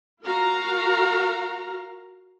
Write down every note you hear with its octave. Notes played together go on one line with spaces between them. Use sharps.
F4 F#4 A#4 F5 A#5